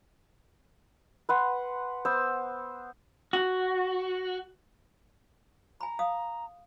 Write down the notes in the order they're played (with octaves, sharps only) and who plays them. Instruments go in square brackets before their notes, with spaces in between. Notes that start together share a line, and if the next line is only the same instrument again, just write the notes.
[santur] B4 F#5 C6
B3 C5 E6
[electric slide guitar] F#4
[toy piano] G#5 B5 [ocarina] A#5
[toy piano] F5 D#6